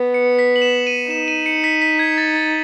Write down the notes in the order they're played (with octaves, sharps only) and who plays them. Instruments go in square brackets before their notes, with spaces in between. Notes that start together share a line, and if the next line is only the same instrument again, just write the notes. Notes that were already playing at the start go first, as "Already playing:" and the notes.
Already playing: [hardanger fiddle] B3
[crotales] C#7
B6
F#7
E7
D#7
[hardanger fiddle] D#4 [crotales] E7
[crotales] D#7
C#7
B6
B6
G#6
A6
A6